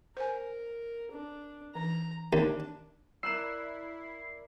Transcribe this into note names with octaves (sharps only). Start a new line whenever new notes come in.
A#4 C5 G#5
D4
E3 A#5
D#2 D4
E4 A#4 D5 E6 F#6 C7 E7